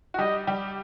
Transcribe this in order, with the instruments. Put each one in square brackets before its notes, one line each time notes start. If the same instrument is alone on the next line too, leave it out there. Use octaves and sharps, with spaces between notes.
[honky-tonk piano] F#4
[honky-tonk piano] G3 G4 [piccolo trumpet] D#5
[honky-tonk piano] G3 G4